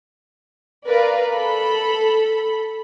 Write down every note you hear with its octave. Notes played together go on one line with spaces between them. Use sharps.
A#4 B4 D5 F5
A4 B5